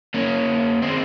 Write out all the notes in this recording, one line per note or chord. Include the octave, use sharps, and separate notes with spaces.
A#3 C#4
G#3 C4